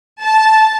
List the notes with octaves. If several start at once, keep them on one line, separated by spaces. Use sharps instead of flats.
A5